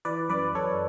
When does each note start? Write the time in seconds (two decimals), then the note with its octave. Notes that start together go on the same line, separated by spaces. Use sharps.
0.05 E3 B4 D5
0.29 F#2 B4 D5
0.55 F#2 A4 C#5